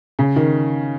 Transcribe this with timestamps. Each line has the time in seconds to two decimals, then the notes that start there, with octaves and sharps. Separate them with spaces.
0.19 C#3
0.36 D#3